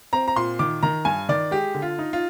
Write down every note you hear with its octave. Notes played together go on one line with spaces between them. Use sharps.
C4 A#5
A#5
A#2 C6
D#3 D6
D#3 A#5
G2 G#5
D#3 D5
G#3 G4
D3
F4
D#4
F4